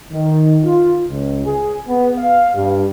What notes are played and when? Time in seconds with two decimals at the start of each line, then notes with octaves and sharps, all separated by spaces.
0.12 D#3
0.64 F4
1.08 C#2
1.46 G#4
1.88 B3
2.19 F5
2.55 G2